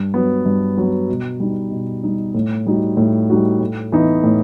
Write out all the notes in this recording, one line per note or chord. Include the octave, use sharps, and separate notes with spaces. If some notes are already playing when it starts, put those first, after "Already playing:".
Already playing: G2
F#3 B3
G2
F#3 B3
B2
G3 D#4
B2
G3 D#4
A2
G3 D#4 F#4
A2
G3 D#4 F#4
A2
E3 B3 D#4
A2